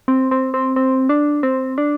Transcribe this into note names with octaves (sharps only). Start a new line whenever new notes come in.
C4
C4
C4
C4
D4
C4
D4